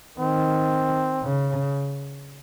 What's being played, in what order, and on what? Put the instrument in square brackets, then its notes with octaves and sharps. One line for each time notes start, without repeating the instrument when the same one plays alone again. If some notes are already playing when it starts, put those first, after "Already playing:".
[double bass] D#3 [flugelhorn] C4
[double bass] C#3